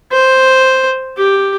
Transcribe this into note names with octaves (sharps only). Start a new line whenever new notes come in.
C5
G4